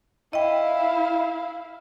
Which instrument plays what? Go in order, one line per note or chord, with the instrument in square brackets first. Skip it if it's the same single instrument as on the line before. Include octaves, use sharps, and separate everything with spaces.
[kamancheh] E4 F5 [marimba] D#5 G5